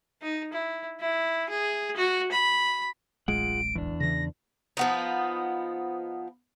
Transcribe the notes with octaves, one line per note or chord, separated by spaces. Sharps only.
D#4
E4
E4
G#4
F#4
B5
D1 A1 G#3 F4 G#4 F#5 D7
E2 D4
C#3 E3 A#6
F3 B3 D#4